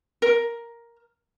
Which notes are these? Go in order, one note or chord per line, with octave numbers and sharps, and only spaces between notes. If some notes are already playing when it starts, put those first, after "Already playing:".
A#4